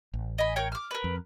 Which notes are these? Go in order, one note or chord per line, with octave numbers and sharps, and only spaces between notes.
A1
D#5 G#5 B5
A#4 C#5 G5
D6 F6
A#4 B4
F2